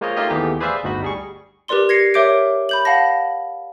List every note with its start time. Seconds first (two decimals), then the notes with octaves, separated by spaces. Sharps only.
0.01 G#3 A#3 F4 C5 C#5 D#5
0.17 A3 A#3 D#4 F4 G4 D#5
0.30 D#2 E3 A3 B3 G4 G#4
0.60 G#4 B4 C5 D5 E5 F5
0.83 G1 D2 D#4 F#4 B5
1.02 G3 G#4 C#6
1.68 G4 A#4 B4 D5 C6 G7
1.89 G#6 A#6 C7 C#7
2.14 A#4 C#5 E5 D6 G6 D7
2.69 B5 G6 F#7
2.85 F5 F#5 A5 A#6